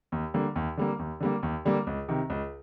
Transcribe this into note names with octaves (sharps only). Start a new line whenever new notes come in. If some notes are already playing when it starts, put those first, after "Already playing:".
D#2
D3 G3 A#3
D#2
D3 G3 A#3
D#2
D3 G3 A#3
D#2
D3 G3 A#3
C#2
C3 D#3
C#2